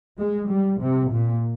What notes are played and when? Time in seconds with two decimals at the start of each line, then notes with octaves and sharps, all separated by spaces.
0.19 G#3
0.49 G3
0.80 C3
1.11 A#2